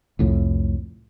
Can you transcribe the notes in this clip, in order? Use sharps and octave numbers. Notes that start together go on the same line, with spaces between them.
C2 F2 A2